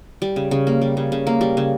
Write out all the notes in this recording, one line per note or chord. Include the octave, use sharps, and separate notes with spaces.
G3
C#3
C#3
A#3
G3
C#3
C#3
A#3
G3
C#3